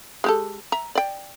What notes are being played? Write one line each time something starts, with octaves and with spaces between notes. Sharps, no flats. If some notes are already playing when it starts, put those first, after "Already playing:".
G#3 G4 A4
E5 A#5
D5 G5